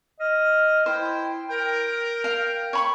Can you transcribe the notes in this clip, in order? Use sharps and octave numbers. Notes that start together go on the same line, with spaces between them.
D#5 F6
E4 C5 G5
A#4 G5
F5
C#5 B5 C#6